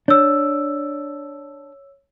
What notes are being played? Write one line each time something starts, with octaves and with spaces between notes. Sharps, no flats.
D4 C#5 E6